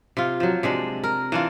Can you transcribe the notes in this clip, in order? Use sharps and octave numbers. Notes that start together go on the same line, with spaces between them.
C3 F4
F3 F#3
C3 G#3 D4
A#4
E3 D4 F4